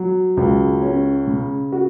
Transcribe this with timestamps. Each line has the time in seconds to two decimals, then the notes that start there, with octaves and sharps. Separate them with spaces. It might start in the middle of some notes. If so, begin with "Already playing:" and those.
Already playing: F#3
0.37 C#2
0.82 C#4
1.27 C#3
1.72 F#4